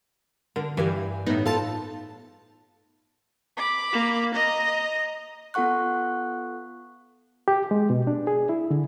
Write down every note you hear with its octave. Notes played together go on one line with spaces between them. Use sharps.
D3 A#4
G2 E3 G4 G#5
A2 B3 D#4
F4 A4 F5 A5 A6
B5 D6
A#3
D#5 A#5 A#6
B3 F4 A4 F#5 C#6 F#6
G4
G#3
B2
D4
G#4
E4
D3